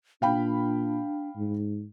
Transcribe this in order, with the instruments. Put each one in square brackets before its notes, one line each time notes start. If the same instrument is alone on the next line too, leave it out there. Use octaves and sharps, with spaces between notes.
[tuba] A#2 [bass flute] D4 [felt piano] F5 G5 B5
[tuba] G#2